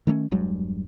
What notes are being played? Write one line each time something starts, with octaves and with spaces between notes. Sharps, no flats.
D#3 A3 B3 C#4
E1 G2 F#3 G#3